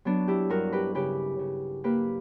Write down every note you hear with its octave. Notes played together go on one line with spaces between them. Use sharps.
F#3 B3 D4
E4 G4
G2 F#4 A#4
G4 B4
C#3 G4 B4
C#3
A#3 G4 B4